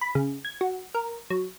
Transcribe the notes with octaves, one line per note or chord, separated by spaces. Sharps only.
B5
C#3
G#6
F#4
A#4
F#3